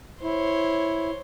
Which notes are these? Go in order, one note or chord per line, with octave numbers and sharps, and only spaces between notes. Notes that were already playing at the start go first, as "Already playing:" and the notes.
E4 C5 C#5